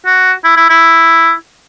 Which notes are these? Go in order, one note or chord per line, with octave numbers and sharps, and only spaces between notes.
F#4
E4
E4
E4